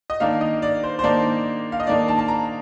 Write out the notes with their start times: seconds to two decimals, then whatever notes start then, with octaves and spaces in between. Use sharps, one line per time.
0.10 D#5
0.20 D#3 A#3 D4 F5
0.41 D#5
0.62 D5
0.84 C5
0.99 C5
1.03 D#3 A#3 D4 D5
1.72 F5
1.80 D#5
1.87 D#3 A#3 D4 D5
2.08 A5
2.19 A5
2.28 A#5